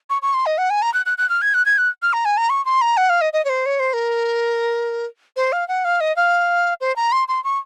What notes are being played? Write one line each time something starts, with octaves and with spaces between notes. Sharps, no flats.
C#6
C#6
C6
D#5
F#5
G#5
A#5
F#6
F#6
F#6
F6
G#6
F#6
G#6
F#6
F6
A#5
G#5
A#5
C#6
C6
A#5
F#5
F5
D#5
D#5
C#5
C5
C#5
C5
A#4
C5
F5
F#5
F5
D#5
F5
C5
A#5
C6
C6
C#6